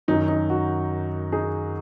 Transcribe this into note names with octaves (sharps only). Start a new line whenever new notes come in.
F#2 D#3 F#3 D#4
D#4
F#4
D#4 G#4